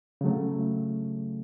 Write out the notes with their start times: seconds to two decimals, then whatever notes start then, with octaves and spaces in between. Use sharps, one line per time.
0.21 C#3 F#3 A3